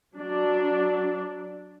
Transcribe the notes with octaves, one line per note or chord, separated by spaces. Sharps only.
F#3 D4 D5